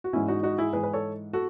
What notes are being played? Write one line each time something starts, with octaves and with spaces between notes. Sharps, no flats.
F#4
G#2 E3 C#4 E4
D#4 F#4
D#4 F#4
E4 G#4
G#2 E3 G#4 B4
B4
A4 C#5
F#4 A4